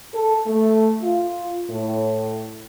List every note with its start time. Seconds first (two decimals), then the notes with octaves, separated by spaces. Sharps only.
0.13 A4
0.46 A3
1.01 F4
1.68 A2